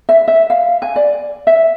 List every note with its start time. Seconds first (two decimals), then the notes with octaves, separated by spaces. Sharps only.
0.09 E5
0.28 E5
0.50 F5
0.82 G#5
0.96 D5
1.47 E5